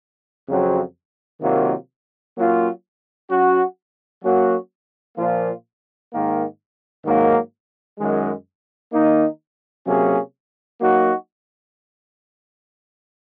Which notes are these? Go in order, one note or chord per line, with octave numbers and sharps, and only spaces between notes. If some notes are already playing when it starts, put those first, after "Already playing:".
F2 C#3 F#3 C4
C3 D#3 F#3 A#3 F4
F#3 A#3 C#4 F4
F#3 C#4 F#4
F#3 A#3 C#4 F#4
A#2 F3 A#3 F4
G#2 D#3 A#3
G#2 D#3 F#3 A#3
F#2 D#3 G#3
D#3 A#3 D#4
C3 F#3 A#3 C#4 G#4
F#3 A#3 D#4 F#4